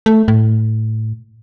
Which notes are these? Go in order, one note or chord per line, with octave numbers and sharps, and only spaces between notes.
A3
A2